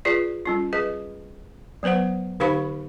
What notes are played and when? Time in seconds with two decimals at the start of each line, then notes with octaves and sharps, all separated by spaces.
0.05 F4 G#4 B4 D5
0.46 G3 C#4 F4
0.73 G#4 B4 D#5
1.83 F#3 B3 B4 C5 F#5
2.40 D3 D#4 G4 C5 F5 C#6